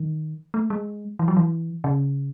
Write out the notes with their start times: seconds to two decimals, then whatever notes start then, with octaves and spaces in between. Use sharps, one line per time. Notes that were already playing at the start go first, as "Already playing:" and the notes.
Already playing: D#3
0.54 A3
0.70 G#3
1.19 E3
1.28 F#3
1.37 E3
1.84 C#3